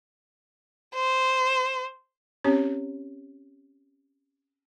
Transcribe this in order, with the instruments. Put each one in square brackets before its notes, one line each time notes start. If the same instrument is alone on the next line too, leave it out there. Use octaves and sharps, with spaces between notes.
[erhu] C5
[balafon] C4 C#4 G4 C#5